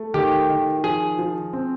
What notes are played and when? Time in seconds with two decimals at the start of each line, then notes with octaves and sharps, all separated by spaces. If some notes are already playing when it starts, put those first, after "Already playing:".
Already playing: A3
0.14 D#3 G4
0.49 D#3
0.84 F3 G#4
1.19 F3
1.53 C4